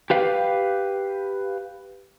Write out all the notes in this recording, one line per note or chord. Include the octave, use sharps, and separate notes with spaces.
G4 B4 F5